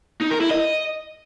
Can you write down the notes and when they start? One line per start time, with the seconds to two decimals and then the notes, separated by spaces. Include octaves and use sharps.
0.21 D#4
0.31 A#4
0.41 E4
0.51 D#5